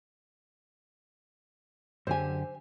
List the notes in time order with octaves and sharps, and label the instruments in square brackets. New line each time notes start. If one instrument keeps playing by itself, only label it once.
[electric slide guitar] F#2 D3 G4 [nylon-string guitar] C5 G#5